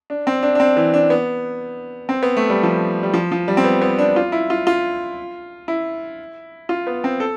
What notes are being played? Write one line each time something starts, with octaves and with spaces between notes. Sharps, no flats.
D4
C4
D4
D4
C4
E3
D4
B3
C4
B3
A3
G3
F3
G3
F3
F3
G3
C4
B3
B3
D4
F4
E4
F4
F4
E4
F4
B3
C4
A4